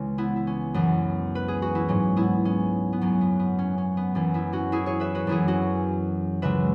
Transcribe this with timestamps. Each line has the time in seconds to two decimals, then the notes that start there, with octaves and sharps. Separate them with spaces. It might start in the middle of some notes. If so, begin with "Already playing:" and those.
Already playing: C#2 C#3 E3 C#4
0.18 B3 E4
0.36 E4
0.47 C#4
0.74 F#2 E3 B3
1.35 B4
1.48 G#4
1.62 F#4
1.75 E4
1.88 G#2 F#3 C#4
2.17 B3 E4
2.45 C#4
2.93 B3
3.01 F#2 F#3 C#4
3.21 B3
3.39 B3
3.59 C#4
3.78 C#4
3.97 B3
4.15 F#2 E3 C#4
4.34 B3 E4
4.53 C#4 F#4
4.72 E4 G#4
4.86 G#4 C#5
5.00 B4 E5
5.15 F#4 B4
5.27 F#2 E3 E4 G#4
5.48 C#4 F#4
6.42 C#2 C#3 F#3 B4 E5